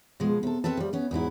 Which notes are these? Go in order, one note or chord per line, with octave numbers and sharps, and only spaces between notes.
B2 F3 G#3
C3 A4
C4 A4 B4 E5 A5
F3 G3
B3 C#4
E2 G#2 F#3 E4